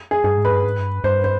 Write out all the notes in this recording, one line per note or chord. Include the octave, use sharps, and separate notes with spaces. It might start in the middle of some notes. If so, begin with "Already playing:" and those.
G#4
G2 G#4
G#2
B4
G2
G#2
G2
G2 C5
C5